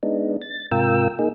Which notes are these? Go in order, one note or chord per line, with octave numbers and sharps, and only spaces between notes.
G#3 B3 D4 D#4
A6
G#2 C3 F4 A#4 G5 E6
A#3 D#4 G#4